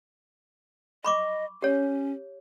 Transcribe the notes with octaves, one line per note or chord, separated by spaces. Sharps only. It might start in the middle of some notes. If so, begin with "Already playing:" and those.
D#5 B5 C#6 D6
C#4 G4 C#5